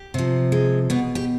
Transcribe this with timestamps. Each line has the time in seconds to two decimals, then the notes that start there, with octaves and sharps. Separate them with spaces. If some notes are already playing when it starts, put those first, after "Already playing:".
Already playing: G4
0.14 C3 F3
0.52 G#3
0.90 B2 B3
1.15 G4